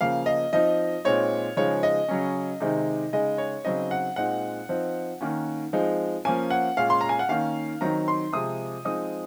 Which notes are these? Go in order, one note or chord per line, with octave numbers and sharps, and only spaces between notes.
C#3 F3 A#3 F5
D#5
F3 C4 D#4 D#5
A#2 G#3 C4 D#4 C#5
C#3 F3 G#3 D#4 C#5
D#5
C#3 F#3 C#4
C3 D#3 G#3 C4 D#4
C#3 G#3 D#4 D#5
C#5
C#3 F#3 C4 D#4 D#5
F#5
A#2 G#3 C4 D#4 F#5
F3 C4 D#4
D#3 A#3 C#4
F3 G#3 C4 D#4
F3 A#3 C#4 G#5
F#5
A#2 G#3 C#4 F5
C6
A#5
G#5
F#5
D#3 A#3 C#4 F5
D#3 F#3 C4 D#4 A#5
C6
C3 F3 G#3 D#6
F3 G#3 C4 D#4 D#6